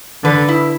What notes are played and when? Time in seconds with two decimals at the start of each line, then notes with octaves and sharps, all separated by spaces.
0.24 D3 B4
0.48 E4